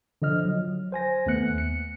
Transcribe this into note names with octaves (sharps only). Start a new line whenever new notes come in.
D3 F3 D#5 F6
F#3
C5 G#5 A#6
D#2 A3 B3 F#6 C#7
C#7